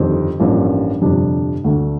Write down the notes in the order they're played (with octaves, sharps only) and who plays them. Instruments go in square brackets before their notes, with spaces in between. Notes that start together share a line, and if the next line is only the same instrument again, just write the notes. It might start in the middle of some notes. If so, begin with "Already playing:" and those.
Already playing: [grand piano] G1 F2 D#3 G3 C4
A1 G2 F3 A#3
G1 F2 C3 G3 D4
D2 D3 A3 D4